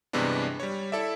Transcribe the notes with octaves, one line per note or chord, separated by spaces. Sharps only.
G2 C3 E3 G#3 B3 D4
G3 C#5
E4 A4 D5 E5